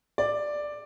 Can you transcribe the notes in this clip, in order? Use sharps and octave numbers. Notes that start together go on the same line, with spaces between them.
D5